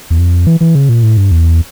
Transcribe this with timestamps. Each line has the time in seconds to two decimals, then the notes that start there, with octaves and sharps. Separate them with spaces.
0.10 E2
0.19 F2
0.47 E3
0.61 E3
0.75 C#3
0.89 A#2
1.03 A2
1.17 G2
1.31 E2